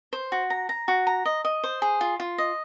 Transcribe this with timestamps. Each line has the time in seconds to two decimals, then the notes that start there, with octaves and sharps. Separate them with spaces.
0.13 C5
0.32 F#4
0.50 A#5
0.69 A#5
0.88 F#4
1.07 A#5
1.26 D#5
1.45 D#5
1.64 C5
1.82 G#4
2.01 F4
2.20 F4
2.38 D#5